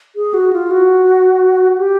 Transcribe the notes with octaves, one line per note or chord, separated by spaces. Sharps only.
G#4
F#4
F4
F#4
G4